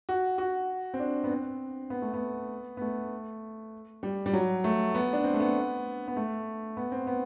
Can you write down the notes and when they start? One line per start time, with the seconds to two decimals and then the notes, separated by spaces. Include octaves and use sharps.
0.09 F#4
0.38 F#4
0.94 C4
0.99 D4
1.24 B3
1.30 C4
1.90 B3
2.02 A3
2.14 B3
2.77 B3
2.81 A3
4.03 G3
4.26 G3
4.33 F#3
4.64 A3
4.95 B3
5.13 D4
5.24 C4
5.34 A3
5.40 B3
6.08 B3
6.16 A3
6.77 B3
6.92 C4
7.07 B3